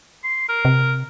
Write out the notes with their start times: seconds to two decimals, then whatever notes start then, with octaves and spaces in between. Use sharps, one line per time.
0.24 C6
0.49 A#4
0.65 C3